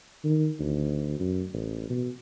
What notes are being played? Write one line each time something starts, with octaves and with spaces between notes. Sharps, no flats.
D#3
D2
F#2
A1
B2